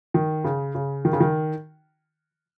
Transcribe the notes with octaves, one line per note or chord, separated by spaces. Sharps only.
D#3
C#3
C#3
D#3
C#3
D#3